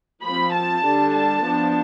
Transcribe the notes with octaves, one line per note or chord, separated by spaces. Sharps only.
F3 C4 B5
A5
D3 G3 D4
A5
F3 B3 D4